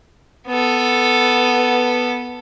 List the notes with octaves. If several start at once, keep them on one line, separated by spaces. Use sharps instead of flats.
B3 A4